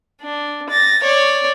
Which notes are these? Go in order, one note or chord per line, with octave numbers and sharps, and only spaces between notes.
D4
A6 A#6
C#5 D5